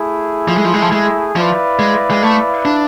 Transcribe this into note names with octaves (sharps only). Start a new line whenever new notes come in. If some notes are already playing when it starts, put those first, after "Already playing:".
Already playing: A3 E4 G#4
F3
G#3
F3
G#3
F3
G#3
F3 E4 B4 D5 F5
G#3
G#3
A3
D4